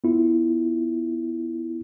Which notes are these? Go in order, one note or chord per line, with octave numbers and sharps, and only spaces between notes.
B3 E4 F4